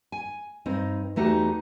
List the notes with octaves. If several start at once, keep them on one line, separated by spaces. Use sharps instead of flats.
G#5
G2 C4 D#4
E2 A3 D#4 F#4 G4